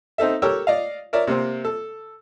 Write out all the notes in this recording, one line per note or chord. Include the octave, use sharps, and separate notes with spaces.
C4 D#4 A4 E5
G4 A4 A#4 C#5 G5 E6
D5 D#5 F5
A#4 C#5 D5 E5
C3 A#3 C4
A4